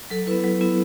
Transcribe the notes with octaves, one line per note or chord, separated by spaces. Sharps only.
F#3 A4
B3 E4 B4
F#3
B3 E4